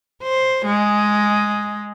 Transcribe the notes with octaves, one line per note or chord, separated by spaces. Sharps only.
C5
G#3